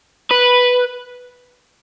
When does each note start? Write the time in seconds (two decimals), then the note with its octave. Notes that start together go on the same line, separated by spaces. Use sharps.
0.31 B4